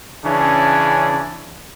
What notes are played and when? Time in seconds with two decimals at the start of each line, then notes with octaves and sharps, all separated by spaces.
0.25 C#3 E3 C#4 D4